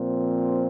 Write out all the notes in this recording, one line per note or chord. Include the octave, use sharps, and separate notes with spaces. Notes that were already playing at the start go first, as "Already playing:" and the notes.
Already playing: A#2 F3 C4